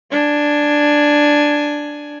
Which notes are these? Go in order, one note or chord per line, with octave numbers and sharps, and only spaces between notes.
D4 G#5